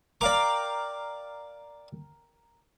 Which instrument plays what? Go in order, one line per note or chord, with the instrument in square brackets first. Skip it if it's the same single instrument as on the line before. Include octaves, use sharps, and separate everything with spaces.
[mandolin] A#4 G5 [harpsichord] D5 F5 D6